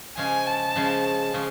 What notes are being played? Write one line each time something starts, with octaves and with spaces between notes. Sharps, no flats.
C#3 F3 G#3 C#4 G#5
A5
C#3 F3 G#3 C#4
C#3 F3 G#3 C#4